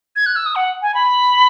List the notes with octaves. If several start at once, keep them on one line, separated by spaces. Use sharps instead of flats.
G#6
F#6
E6
D#6
F#5
G#5
B5